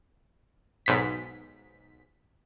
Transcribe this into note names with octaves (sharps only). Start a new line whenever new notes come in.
B1 G#2 B6